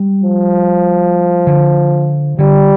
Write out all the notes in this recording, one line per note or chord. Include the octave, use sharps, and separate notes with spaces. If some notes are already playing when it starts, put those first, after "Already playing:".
Already playing: G3
F3
D3
D3 G3